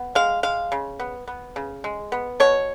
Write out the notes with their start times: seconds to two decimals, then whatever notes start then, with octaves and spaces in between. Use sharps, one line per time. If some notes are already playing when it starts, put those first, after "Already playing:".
Already playing: B3
0.15 G#3 F5
0.43 G#3 F5
0.72 C#3
1.00 B3
1.28 B3
1.56 C#3
1.84 G#3
2.12 B3
2.40 B2 C#5